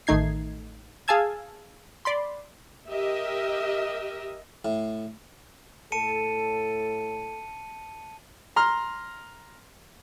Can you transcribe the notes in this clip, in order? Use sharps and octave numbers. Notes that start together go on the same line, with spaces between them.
A1 D#3 A3 D#4 G#6 C7
G#4 F5 G#5 A5 E6 G#6
D5 B5 C6
G4 A#4 D#5 E5
A2
A2 A4 A5 C#7 D#7
A#5 C6 F6